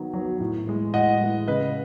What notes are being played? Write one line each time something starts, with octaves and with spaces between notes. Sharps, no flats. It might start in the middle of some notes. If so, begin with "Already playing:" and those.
Already playing: D#3 F#3 B3
F#3 B3
A2
E3 G#3
A2 D#5 F#5
E3 G#3
C#3 B4 D#5